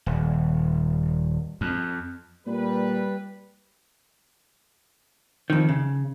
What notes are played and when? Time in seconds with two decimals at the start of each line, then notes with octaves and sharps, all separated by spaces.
0.06 D#1
1.61 F2
2.46 A#2 G3 B4
5.50 F2 D#3
5.69 C#3